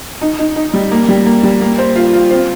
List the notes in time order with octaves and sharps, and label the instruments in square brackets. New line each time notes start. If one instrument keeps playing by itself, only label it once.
[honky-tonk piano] D#4
D#4
D#4
G3
A#3
G3
A#3
G3
A#3
C5
F4
F4
C4